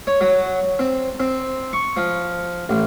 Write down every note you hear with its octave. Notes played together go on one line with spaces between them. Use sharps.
C#5
F#3
C4
C4
C#6
F3
A1